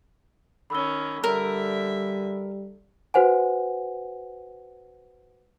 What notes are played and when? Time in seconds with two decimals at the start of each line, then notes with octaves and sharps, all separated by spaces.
0.70 D#3 C#4 B5 E6 G7
1.24 D3 G3 A#4 E5
3.14 F#4 B4 C5 F#5 G#5